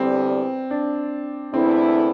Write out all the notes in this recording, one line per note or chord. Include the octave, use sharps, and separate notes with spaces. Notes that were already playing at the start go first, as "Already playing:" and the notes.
Already playing: E2 D3 G3 C4
D4
E2 D3 A3 C4 E4